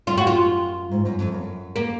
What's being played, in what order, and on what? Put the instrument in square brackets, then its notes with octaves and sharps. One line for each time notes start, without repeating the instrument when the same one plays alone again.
[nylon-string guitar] F#2 [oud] F4
[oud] F#4
F4
[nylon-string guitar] G#2
F#2
F2
F#2
[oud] A#3